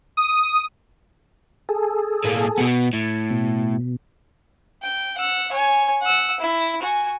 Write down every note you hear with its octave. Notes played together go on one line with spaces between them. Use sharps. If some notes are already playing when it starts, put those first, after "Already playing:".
D#6
G#4 A4
A2 A#3
B2 B3
A2
B2
G5
F#5 E6
C#5 G#5
F#5 E6
E4
F#4 G#5